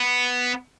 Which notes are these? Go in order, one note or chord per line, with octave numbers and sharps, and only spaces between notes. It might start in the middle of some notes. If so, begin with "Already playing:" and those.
Already playing: B3